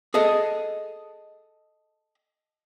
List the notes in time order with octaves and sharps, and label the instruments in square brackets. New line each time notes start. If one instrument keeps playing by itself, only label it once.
[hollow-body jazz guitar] G#4 A4 D#5